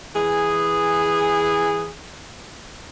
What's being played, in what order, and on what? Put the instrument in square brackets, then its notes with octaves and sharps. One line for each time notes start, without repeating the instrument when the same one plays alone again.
[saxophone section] E3 G#4